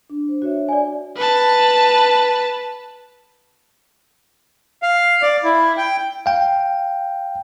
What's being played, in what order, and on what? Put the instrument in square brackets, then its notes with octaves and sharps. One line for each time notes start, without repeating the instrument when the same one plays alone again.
[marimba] D4
C5
F#4 C#5 E5
[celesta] D5 G#5
[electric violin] B4 A5
[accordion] F5
D5
E4
G5
[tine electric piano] F5 G5